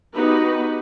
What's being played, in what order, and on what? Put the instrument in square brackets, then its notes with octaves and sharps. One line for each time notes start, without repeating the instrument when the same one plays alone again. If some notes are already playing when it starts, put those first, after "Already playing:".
[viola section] B3 D#4 F#4 G4 B4